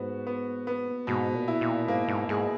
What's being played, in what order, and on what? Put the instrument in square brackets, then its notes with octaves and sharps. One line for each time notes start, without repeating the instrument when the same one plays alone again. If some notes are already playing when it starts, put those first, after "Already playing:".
Already playing: [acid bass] G#2 [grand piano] B3 F#4
[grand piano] B3
B3
[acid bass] G#2 [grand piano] B2
[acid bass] A#2
[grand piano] E4
[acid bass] A#2
[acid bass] G#2 [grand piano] A#3
[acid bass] G#2
[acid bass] G#2 [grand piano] G#4